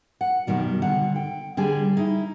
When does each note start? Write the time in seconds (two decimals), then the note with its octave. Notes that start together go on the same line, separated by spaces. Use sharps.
0.21 F#5
0.47 F#2 B2 D#3 G3
0.82 D3 F#5
1.16 G5
1.57 D3 G3 G#4 G#5
1.97 D#4 E4